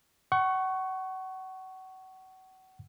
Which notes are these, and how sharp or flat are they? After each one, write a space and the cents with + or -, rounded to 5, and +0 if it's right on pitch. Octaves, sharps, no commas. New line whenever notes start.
F#5 +30 C#6 +0